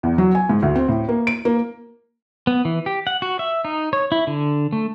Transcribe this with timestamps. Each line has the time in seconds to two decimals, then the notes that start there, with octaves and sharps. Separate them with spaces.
0.03 E2
0.18 F#3
0.35 G#5
0.49 G#2
0.62 D2
0.76 C4
0.89 A2
1.09 A#3
1.27 D7
1.45 A#3
2.47 B3
2.65 E3
2.86 G4
3.07 F#5
3.22 F#4
3.39 E5
3.65 D#4
3.93 C#5
4.12 E4
4.27 D3
4.73 A3